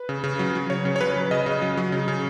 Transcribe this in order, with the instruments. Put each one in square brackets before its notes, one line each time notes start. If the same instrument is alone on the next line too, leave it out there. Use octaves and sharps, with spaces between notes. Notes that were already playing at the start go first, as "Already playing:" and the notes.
Already playing: [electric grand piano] B4
C#3
C#3
F#3
F#3
C#3 C#5
C#3
C#5
F#3 B4
F#3
C#3 D#5
C#3
F#3
F#3
C#3
C#3